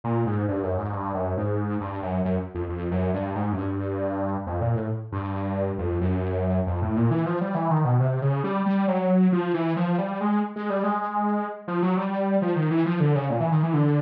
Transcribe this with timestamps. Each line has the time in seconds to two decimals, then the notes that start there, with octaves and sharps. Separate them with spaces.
0.04 A#2
0.26 G#2
0.48 G2
0.63 F#2
0.78 G#2
0.93 G2
1.14 F#2
1.37 G#2
1.81 G2
2.03 F#2
2.25 F#2
2.55 F2
2.69 F2
2.91 F#2
3.14 G2
3.35 G#2
3.53 F#2
3.57 G2
4.47 F2
4.61 A#2
4.75 A2
5.12 G2
5.78 F2
6.01 F#2
6.67 F2
6.82 A2
6.96 A#2
7.11 E3
7.26 F3
7.41 G3
7.55 E3
7.70 D#3
7.85 B2
8.00 C3
8.22 C#3
8.44 G3
8.66 G3
8.88 F#3
9.32 F3
9.54 E3
9.76 F3
9.98 G3
10.20 G#3
10.56 G#3
10.70 G3
10.83 G#3
11.68 F3
11.83 F#3
11.97 G3
12.42 F3
12.56 D#3
12.71 E3
12.86 F3
13.00 D3
13.15 C#3
13.30 A#2
13.40 E3
13.52 D#3
13.63 E3
13.74 D3